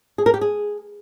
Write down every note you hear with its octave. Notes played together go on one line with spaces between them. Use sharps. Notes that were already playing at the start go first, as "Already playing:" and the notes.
G#4
A#4
G4
G#4